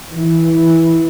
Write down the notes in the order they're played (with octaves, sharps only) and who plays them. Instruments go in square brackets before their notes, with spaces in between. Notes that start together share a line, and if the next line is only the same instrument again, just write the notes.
[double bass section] E3